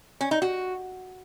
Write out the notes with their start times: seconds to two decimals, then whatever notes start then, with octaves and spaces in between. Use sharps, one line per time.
0.21 C#4
0.31 D#4
0.42 F#4